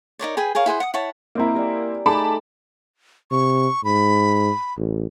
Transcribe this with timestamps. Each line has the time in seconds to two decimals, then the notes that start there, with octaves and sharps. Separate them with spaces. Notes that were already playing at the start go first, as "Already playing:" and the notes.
0.19 D#4 A#4 C#5 D5
0.37 G#4 B4 G5 G#5
0.55 G#4 A#4 C#5 F5
0.66 E4 G#4 C5 F#5
0.80 F#5 D#6
0.94 E4 C#5 F#5 A5
1.35 A#3 C4 E4 D#5 A#5
1.54 G4 D5 G#5
2.06 A3 D#4 G#4 A5 B5 D6
3.31 C3 C#6
3.85 G#2 B5
4.77 A1